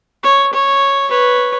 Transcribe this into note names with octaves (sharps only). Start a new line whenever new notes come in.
C#5
C#5
B4 C#5